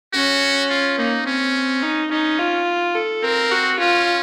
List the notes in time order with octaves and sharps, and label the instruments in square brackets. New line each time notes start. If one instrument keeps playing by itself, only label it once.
[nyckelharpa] C#4 [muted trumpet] F#4
[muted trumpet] F4
[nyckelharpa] A#3 [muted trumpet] D#4
[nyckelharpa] C4 [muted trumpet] C#4
[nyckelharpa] D#4
[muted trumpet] C#4 [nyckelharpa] D#4
[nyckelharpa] F4
A4
[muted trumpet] C4 [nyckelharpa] A#4
[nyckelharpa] F#4
[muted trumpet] C#4 [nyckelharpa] F4